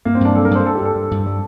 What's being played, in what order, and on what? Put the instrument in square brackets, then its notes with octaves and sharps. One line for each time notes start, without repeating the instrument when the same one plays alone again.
[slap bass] G2 [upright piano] A#3
[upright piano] C4
[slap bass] G2 [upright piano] D4
[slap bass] F#3 [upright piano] A4
[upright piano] A#4
[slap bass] G2 [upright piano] C5
[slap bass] G2 [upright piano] A4
[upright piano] G4
[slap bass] G2 [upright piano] A4
[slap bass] G2
G2
G3